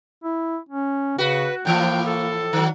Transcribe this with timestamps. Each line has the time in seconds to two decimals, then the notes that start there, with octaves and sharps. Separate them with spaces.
0.24 E4
0.69 C#4
1.18 C#3 F#4 B4
1.65 A2 E3 F3 A#3 G5
2.06 A4
2.53 D#3 F#3